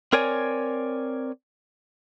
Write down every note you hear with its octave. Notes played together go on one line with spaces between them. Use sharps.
C4 A#4 C#5 D5 G#5